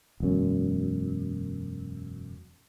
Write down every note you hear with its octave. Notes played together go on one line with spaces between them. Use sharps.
E1 F#2